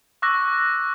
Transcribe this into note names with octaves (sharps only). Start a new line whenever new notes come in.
C#6 D6 E6 F#6 A#6